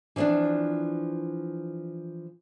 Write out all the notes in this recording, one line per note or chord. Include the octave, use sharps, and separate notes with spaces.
E3 F3 G3 C4 D4